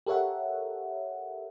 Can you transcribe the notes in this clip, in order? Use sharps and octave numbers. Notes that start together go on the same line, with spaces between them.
G4 A4 A#4 C#5 E5 F#5